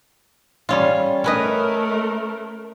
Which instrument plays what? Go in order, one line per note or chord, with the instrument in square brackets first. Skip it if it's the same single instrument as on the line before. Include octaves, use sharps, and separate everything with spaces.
[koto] G3 C#4 F4
[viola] A3 A#4 [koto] C#4 B4 D#5